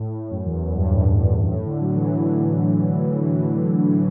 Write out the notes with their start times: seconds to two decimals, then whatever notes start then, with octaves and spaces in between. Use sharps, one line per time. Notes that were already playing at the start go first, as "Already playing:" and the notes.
Already playing: A2
0.31 F#2
0.46 E2
0.61 F#2
0.76 G2
0.91 A2
1.07 A2
1.22 F#2
1.37 G2
1.52 A2
1.66 D3
1.81 F#3
1.96 E3